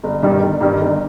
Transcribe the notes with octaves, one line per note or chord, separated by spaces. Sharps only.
G1
G2 D#3 G3
G1
G2 D#3 G3
G1